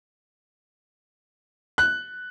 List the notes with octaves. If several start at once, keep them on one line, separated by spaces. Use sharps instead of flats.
F#6